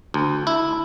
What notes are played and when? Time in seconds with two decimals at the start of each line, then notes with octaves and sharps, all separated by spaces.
0.14 D2
0.47 E4